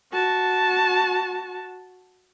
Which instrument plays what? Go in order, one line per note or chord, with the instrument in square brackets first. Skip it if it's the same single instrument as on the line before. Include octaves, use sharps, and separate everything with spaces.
[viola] F#4 A5